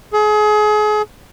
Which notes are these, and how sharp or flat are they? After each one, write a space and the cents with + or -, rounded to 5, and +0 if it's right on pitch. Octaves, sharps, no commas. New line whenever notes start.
G#4 +30